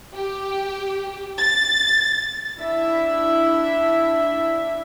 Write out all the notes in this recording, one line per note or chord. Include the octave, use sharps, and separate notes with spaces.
G4
A6
D4 E4 E5